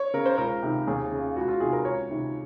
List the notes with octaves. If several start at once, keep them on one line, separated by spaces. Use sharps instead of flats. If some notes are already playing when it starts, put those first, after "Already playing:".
Already playing: C#5
C#3 A#4
C5
C#2 A#4
C3 D#3
D#2 G#4
C#3
C#2 F#4
F4
C3 D#3 G#4
A#4
C#2 C#5
C3 D#3